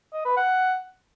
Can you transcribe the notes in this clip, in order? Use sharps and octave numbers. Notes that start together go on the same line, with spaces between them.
D#5
B4
F#5